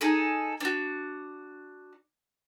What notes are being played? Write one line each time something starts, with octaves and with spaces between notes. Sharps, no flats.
D#4 G#4 A4
D4 F#4